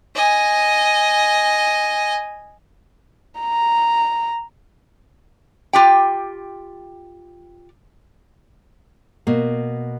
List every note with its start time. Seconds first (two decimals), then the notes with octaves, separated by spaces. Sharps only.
0.15 D#5 G#5
3.40 A#5
5.73 F4 G4 G5
9.27 B2 A#3